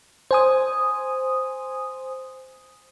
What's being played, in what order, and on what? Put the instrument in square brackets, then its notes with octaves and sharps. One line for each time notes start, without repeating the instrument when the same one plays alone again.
[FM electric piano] C5 G#5 D#6